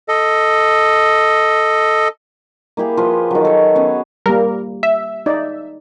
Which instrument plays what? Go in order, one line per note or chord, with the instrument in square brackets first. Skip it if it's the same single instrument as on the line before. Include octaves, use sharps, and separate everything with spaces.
[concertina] A4 D#5
[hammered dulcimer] A#3 E4 G4 G#4
F3 B4 C5 C6
D#3 F#3
A4 C#5
B3 C#4 G#4
[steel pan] G3 A#3 [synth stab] A#4
[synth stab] E5
[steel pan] D#4 D5